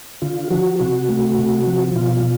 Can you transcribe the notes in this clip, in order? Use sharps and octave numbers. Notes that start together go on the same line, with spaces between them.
D3 F4
F3 F#4
C3 F#4
A3
C3
F3
B2 F4